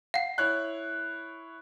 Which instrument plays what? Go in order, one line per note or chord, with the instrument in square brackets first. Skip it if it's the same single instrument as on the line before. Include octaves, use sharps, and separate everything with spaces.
[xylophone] F5 F#5 [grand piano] C7
[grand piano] E4 C#5 F#6